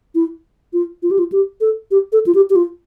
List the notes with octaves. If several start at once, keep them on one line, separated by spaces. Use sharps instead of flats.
E4
F4
F4
G4
F4
G4
A4
G4
A4
F4
G4
G4
F4